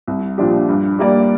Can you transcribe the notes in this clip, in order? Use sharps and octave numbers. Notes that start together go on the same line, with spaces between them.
C2
A#2 F3 D4 G4
G2
G3 A#3 G4 D5